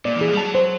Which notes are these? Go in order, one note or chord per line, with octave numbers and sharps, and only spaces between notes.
A#2 D5
E3
G#4
F3
G3
F#3 A5
C5